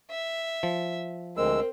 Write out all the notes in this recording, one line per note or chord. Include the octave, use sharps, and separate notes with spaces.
E5
F3
D2 G#3 C4 A#4 E6